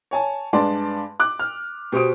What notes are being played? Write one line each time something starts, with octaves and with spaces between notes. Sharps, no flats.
C#5 G#5 A5
G2 G#3 B4 D5 A5 C6
D6 F#6
F6
B2 G4 C5 D#6 D7